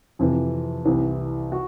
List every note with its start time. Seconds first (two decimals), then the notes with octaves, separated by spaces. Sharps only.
0.19 F2 C3 E3
0.85 C2 C3 E3
1.52 F#4